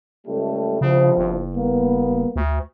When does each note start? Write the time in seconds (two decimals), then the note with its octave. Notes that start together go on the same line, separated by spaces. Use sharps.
0.27 C#2 G3 A3
0.81 G1 C2 C#3 F3
1.18 F#1
1.56 G3 A#3 B3
2.36 D2